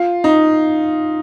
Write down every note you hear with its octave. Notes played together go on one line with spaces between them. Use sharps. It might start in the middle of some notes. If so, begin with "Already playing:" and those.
Already playing: F4
D#4